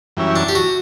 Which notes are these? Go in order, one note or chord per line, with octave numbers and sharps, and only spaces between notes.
F#2 E3 G3 C#4 E4
D4
G4
F#4